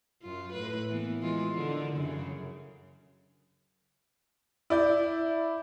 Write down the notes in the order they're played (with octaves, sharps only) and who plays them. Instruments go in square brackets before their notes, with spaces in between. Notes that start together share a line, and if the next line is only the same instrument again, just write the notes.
[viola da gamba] F#2 F4
A2 B4
E3 A#3 B3
E3 G#3 F4
D3 D#3
F#2 C#3
[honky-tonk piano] E4 D5 G6